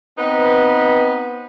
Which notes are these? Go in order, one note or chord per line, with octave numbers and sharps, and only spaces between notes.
B3 C4 D#4 B4